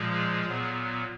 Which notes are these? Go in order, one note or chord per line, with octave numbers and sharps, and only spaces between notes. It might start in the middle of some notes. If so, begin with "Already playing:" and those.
Already playing: A#2 F3 G#3 G#4
A#2 F#3 B3